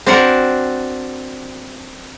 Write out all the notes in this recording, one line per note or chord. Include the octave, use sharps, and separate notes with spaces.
C4 D4 F#4 A#4 F#5